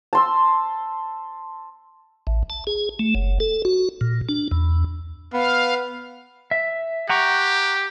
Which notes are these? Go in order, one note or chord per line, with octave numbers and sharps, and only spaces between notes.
A5 C6 E6
A1
A5
G#4
A3
F#1
A4
F#4
A#2
D4
E2
B3 F5
E5
G4 F#5 A#5 C#6